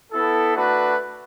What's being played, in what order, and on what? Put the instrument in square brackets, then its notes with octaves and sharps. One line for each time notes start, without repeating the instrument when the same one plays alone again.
[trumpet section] B3 E4 A4
A3 D4 F#4 B4